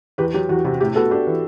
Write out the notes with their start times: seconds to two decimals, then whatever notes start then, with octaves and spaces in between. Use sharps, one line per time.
0.18 E2 G4 B4
0.34 F#3 G4
0.49 E2 F#4
0.65 C3 F#4
0.81 A2 G4
0.96 B3 F#4 A4
1.11 D4 G4
1.27 E3